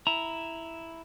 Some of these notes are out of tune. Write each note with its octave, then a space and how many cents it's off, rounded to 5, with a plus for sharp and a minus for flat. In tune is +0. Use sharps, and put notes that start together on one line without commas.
E4 +0 A#5 +0